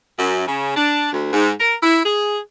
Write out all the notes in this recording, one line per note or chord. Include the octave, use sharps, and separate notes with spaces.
F#2
C#3
D4
D2
G#2
A#4
E4
G#4